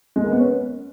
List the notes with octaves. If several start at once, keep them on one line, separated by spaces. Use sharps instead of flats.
G#3
A#3
B3
C#4